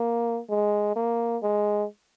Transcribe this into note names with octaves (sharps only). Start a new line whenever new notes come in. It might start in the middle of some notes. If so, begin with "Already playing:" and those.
Already playing: A#3
G#3
A#3
G#3